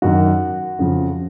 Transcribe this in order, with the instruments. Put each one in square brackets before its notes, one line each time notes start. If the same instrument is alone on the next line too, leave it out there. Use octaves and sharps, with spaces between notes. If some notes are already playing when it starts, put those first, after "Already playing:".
[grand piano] F#2 D#3 F#4
F2 C#3 F3